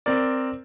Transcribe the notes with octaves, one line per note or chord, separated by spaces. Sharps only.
C4 A#4 D5